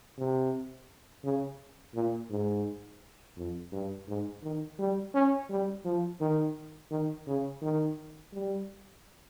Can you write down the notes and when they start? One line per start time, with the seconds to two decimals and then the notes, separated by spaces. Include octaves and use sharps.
0.18 C3
1.24 C#3
1.95 A#2
2.30 G#2
3.37 F2
3.72 G2
4.08 G#2
4.43 D#3
4.79 G3
5.14 C#4
5.50 G3
5.85 F3
6.20 D#3
6.91 D#3
7.27 C#3
7.62 D#3
8.33 G3